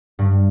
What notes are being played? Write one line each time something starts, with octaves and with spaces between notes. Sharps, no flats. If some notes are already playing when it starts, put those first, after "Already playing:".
G2